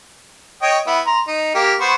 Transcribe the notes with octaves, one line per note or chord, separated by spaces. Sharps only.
C#5 D#5 G5
B3 E4
A#5 C6
D#4
A#3 G4
B3 C5 C#6